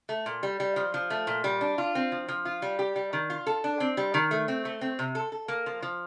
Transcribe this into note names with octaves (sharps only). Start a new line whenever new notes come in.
A3
A#2
G3
G3
F3
F3
A3
A#2
G3
D4
F4
C4
F3
F3
F4
G3
G4
G3
D#3
F4
A4
D4
C4
G3
D#3
A3
C4
A3
C4
C3
A4
A4
A#3
F3
F3